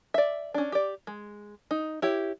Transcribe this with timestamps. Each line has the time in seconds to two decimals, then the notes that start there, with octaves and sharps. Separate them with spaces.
0.14 D5 E5
0.54 C#4 D4
0.72 G4 D5
1.07 G#3
1.71 D#4
2.02 E4 G4 C#5